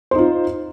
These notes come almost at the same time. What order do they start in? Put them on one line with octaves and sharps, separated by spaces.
C5 D#4 F4